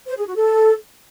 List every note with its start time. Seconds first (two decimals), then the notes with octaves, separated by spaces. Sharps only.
0.08 C5
0.17 G#4
0.27 F#4
0.36 A4